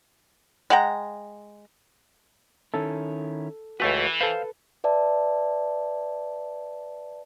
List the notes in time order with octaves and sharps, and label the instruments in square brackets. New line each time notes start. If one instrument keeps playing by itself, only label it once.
[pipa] G#3 F#5 G5 A#5
[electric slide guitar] D#3 C#4 E4 [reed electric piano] A4
[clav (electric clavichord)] C#2 A3 B4 [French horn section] E3 [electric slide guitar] F#4
[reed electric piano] A4 B4 [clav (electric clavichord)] C5 [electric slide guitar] F5
[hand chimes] B4 D5 E5 A5